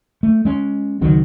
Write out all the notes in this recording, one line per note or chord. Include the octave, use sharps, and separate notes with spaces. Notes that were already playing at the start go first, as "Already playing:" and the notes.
A3
G#3 C#4
C#2 D#3 F#3 C4